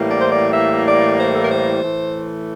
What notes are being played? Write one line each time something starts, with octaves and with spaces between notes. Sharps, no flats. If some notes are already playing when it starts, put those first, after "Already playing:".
Already playing: A2 E3 G3 A#3
D5
C5
D5
E5
D5
C5
A4
A#4
C5
A2 E3 A3